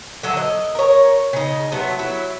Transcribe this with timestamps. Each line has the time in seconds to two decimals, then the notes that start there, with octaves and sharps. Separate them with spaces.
0.23 D3 F#3 A4 E5
0.37 D#5
0.75 A#4 C#5
1.33 C#3 D#4
1.72 C3 F#3 A3 B3
1.99 F#3 E4